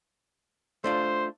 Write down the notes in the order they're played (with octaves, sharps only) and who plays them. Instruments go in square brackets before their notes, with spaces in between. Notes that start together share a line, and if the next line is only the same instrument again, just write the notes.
[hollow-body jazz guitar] A3 D4 F4 [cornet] C5